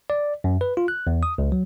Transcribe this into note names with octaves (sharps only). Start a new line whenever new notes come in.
D5
F#2
B4
F4
F#6
E2
D#6
C#2
F#3